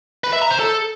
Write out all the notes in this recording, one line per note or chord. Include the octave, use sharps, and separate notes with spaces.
B4
E5
A#5
C5
A4